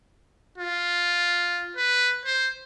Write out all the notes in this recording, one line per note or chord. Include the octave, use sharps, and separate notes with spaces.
F4
B4
C5